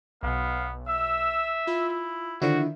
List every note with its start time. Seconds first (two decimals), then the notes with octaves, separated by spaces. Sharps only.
0.23 B1 B2 B3 F5
0.88 E5 E6
1.67 E4 F4
2.42 D3 D#3 F3 E4 F#4 E5